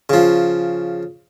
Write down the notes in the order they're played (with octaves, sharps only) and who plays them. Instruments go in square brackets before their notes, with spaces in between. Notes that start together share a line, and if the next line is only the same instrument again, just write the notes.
[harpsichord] C#3 F3